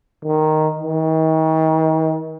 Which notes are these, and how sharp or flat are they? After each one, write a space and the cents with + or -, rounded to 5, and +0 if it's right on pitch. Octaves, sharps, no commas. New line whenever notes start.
D#3 -5
D#3 +40